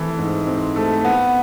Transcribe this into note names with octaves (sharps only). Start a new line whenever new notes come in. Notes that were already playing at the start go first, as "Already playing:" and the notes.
Already playing: E3 A3 C4
G#2
C4
A3
B3